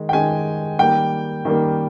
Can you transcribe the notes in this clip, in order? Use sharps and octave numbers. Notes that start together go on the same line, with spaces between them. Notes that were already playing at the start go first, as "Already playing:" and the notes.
Already playing: D#3 G#3
G5
D#3 G#3 G#5
D#3 G3 A#3 G5
D#3 G3 A#3